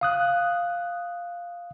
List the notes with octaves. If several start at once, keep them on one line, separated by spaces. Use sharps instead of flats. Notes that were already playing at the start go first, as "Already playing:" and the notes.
F5 D#6 F#6